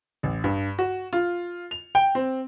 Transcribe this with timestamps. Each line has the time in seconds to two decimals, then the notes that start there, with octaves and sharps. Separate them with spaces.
0.23 A1
0.44 G2
0.79 F#4
1.13 F4
1.71 F7
1.95 G5
2.15 C4